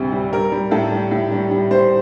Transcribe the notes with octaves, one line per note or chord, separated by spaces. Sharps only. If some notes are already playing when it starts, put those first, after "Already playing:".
Already playing: D2 C3 G3
G3
G3 A#4
G3
A2 A4
G3
A2
G3
G3
G3 C5